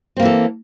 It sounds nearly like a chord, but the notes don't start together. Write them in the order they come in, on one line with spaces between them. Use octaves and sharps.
C4 A#3 E3 A4